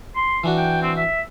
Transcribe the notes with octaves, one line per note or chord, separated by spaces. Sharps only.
C6
E3 D4 F#4
G5
C4
E5